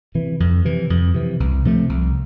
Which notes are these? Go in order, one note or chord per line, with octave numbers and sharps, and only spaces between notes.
C3 E3
F2
C3 E3
F2
C3 E3
C2
C3 F3 A3
C2